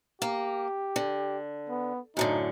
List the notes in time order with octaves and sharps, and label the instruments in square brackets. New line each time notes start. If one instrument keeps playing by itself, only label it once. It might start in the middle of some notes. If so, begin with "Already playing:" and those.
[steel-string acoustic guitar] A#3 [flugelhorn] G4
[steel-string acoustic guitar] D3
[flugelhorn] B3
[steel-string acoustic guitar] F#2 A2 D3 [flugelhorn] D#4